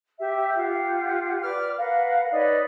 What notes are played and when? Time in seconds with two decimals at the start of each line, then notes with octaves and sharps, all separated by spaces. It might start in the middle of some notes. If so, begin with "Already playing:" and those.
0.18 G4 E5
0.55 F4 G4 F#5
1.43 B4 D5 D6 F6
1.77 A#4 B4 F5 F#5
2.31 D#4 B4 C#5 D5